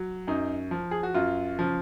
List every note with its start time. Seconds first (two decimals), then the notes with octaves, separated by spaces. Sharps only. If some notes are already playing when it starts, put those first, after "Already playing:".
Already playing: F#3
0.27 F#2 D#4
0.71 F3
0.91 G#4
1.03 F#4
1.14 F#2 F4
1.59 C#3 F3